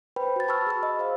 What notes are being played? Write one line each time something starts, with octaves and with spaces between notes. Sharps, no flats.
B4 C5 G5 B5
F#4 A6
A5 B5 C#6 E6 F6
G#4 B5 E6
D#5
C5 F5